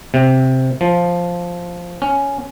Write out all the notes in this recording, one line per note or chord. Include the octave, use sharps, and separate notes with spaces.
C3
F3
C#4